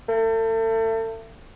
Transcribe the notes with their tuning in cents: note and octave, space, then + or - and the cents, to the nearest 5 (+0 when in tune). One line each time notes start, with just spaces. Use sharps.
A3 +35